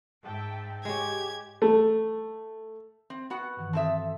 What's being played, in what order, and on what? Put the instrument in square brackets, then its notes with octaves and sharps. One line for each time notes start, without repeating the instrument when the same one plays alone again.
[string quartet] G#2 [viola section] E5 G5 A5
[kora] G#3 C#5 [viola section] G4 [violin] G#6
[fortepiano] A3
[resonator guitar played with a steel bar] C4
B3 F#4 F#5
[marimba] G2 D#3 E3
[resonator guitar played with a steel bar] C4 A4 E5 [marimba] A5 D#6